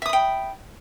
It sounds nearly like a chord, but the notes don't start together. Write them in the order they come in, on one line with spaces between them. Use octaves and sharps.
E5 D#6 B5 G5